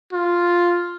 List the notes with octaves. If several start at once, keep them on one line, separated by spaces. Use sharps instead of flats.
F4